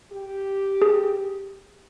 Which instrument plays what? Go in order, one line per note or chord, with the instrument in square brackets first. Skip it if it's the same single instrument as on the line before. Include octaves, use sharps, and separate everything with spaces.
[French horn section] G4
[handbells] G#4